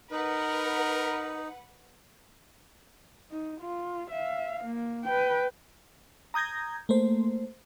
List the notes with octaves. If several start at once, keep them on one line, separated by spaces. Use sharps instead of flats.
D#4 A#4 B4 F#5
D#4
F4
E5 F5
A#3
B4 G5
A#5 D#6 G6 G#6 A#6
A3 A#3 C5